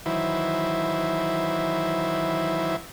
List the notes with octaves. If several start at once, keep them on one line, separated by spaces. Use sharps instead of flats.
D#3 E3 F#3 E4 B4 C5